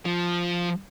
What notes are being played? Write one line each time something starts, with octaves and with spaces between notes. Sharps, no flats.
F3